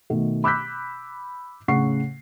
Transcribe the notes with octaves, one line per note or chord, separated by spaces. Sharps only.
B2 D#3 A3
B5 D6 E6 F#6 G6 B6
A2 C#3 F#5 C#6 C7